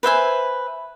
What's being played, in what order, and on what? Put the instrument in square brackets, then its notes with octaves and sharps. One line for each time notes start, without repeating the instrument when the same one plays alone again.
[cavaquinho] B4 C5 E5 G#5